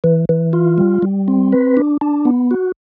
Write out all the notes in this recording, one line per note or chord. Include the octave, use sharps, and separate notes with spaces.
E3
E3
F4
G3
G3
C4
B4
D4
D4
B3
F#4